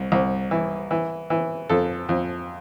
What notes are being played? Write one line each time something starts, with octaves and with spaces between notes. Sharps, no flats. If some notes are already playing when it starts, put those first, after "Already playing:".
Already playing: C2
C2
E3
E3
E3
F2 A4
F2